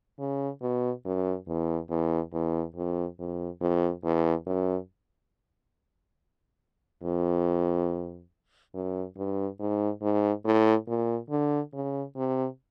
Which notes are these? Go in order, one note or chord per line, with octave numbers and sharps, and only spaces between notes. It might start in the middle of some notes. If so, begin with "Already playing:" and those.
C#3
B2
F#2
E2
E2
E2
F2
F2
F2
E2
F#2
F2
F#2
G2
G#2
G#2
A2
A#2
D3
C#3
C3